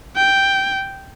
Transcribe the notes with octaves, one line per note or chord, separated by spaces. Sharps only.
G5